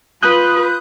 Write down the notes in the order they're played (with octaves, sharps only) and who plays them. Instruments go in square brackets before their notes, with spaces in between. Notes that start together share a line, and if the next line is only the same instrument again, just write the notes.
[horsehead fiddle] F4 B4 [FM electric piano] D#6 F#6 G6